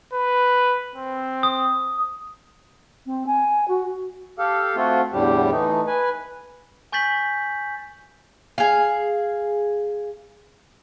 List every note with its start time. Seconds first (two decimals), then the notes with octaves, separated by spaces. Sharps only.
0.13 B4
0.96 C4
1.43 D#6
3.06 C4
3.26 G#5
3.68 F#4
4.39 G4 A4 F5
4.76 A3 C4 F4 F#4
5.13 E2 A2 D3 G3 G4
5.52 E3 A3 D#4
5.87 B4 G#5
6.92 G#5 C#6 G6 A6 B6 F#7
8.58 G#4 F5